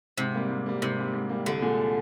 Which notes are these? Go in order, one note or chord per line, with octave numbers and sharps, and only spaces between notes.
G#2 C3
G3 A#3
G#2
G3 A#3
G#2 C3
G3 A#3
G#2
G3 A#3
C2 D3
A#2 G#3